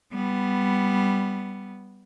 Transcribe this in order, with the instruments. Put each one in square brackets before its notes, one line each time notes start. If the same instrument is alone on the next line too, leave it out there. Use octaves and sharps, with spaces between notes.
[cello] G3 B3